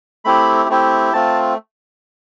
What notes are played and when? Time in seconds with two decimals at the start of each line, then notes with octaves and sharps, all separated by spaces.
0.25 A3 C4 E4 G4 B5
0.69 A3 C4 E4 G4
1.13 A3 C4 F4 A5